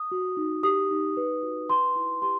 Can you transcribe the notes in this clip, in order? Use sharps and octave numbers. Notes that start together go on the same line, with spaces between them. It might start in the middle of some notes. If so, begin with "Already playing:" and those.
Already playing: D#6
F#4
D#4
G4 D#6
D#4
B4
F#4
B4 C6
E4
G4 C6